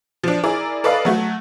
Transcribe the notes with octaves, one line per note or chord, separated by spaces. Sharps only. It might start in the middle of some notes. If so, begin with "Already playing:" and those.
F3 D4
E4 G#4 A#4 D5
A4 B4 D5 D#5 F5
F#3 A3 F#4